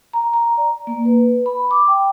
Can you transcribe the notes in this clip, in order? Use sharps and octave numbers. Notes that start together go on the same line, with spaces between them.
A#5
A#5
D5
A#3
B4
B5
D6
G5